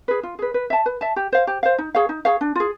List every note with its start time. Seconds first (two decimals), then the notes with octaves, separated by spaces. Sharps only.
0.08 G#4 B4
0.23 F4
0.39 G#4 B4
0.54 B4
0.70 E5 A5
0.86 B4
1.01 E5 A5
1.16 G4
1.32 C5 F5
1.47 G4
1.63 C5 F5
1.78 D#4
1.95 G#4 C#5 F5
2.09 D#4
2.25 G#4 C#5 F5
2.41 D4
2.55 F4 G#4